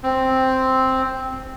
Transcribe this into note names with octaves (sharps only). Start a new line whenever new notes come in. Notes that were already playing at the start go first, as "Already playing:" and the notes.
C4